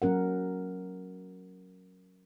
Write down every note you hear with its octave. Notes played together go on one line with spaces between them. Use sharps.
F#3 C#4 A#4 F#5